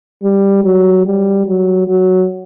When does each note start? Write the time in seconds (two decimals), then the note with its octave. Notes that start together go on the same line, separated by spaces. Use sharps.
0.23 G3
0.64 F#3
1.06 G3
1.47 F#3
1.88 F#3